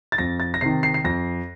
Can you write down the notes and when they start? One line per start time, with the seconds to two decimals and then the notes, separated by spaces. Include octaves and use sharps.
0.12 A6
0.18 F2 A#6
0.40 A6
0.54 A#6
0.61 C3 D#3 C7
0.83 C7
0.94 C7
1.04 F2 A#6